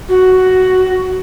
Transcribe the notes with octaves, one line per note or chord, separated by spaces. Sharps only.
F#4